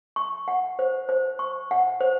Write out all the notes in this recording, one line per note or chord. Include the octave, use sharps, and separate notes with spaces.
C#6
F#5
C5
C5
C#6
F#5
C5